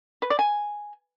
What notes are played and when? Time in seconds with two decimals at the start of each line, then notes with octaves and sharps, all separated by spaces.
0.22 B4
0.30 D5
0.39 G#5